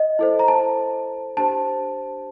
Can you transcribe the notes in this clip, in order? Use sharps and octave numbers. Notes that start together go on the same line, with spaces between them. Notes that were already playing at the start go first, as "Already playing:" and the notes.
Already playing: D#5
E4 A4 C5
A#5
A5
D4 G4 C5 A5